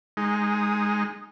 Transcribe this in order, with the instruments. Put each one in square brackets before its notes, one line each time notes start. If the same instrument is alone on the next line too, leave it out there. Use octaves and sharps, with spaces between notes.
[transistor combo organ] G#3 D#4